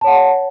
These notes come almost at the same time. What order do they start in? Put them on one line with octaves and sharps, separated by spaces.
A5 C#5 F#5